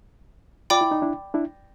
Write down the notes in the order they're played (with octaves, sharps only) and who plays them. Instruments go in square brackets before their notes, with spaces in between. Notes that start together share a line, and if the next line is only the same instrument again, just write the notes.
[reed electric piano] F4 [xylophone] D5 G5 B5 D6
[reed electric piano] E4
D#4
D4 E4
D4 E4